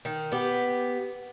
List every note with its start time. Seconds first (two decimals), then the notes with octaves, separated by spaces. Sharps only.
0.05 D#3
0.32 B3 G4